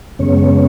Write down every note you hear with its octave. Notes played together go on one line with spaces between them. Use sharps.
F#2 C#3 G#3 B3 C#4 C#5